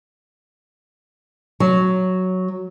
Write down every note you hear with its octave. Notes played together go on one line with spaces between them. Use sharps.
F#3